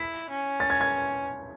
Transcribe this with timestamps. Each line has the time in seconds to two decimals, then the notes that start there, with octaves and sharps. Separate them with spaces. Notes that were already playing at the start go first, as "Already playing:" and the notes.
Already playing: E4 B6
0.30 C#4
0.60 A6
0.70 G#6
0.81 G#6